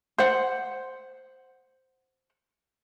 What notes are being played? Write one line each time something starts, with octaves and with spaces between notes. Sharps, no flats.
C5 F#5